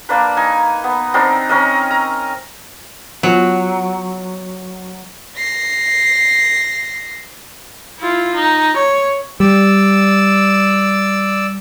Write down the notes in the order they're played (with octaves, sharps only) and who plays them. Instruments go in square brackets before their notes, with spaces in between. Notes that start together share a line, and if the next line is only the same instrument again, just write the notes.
[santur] A#3 D4 B4
D#4 G#5
B3
C4 D4 D#4 A#4
C4 C#4 A#4 D#5
A#5
[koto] F#3 [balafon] B3 F4
[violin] A#6 C7
[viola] E4 F4
D#4
C#5
[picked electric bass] G3 [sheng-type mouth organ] D5 E6